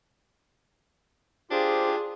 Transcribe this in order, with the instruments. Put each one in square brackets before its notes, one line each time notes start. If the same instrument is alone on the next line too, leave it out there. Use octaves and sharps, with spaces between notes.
[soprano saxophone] D4 [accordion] F4 G4 [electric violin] G#4 [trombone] C5